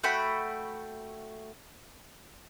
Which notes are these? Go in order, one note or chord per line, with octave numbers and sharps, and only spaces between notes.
A3 F#4 G5 B5